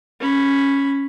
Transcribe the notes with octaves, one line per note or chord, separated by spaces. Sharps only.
C#4 B5